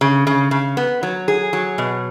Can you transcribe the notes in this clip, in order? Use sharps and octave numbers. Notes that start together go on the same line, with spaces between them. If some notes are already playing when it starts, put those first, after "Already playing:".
C#3
C#3
C#3
B3
F#3
G#4
F#3
B2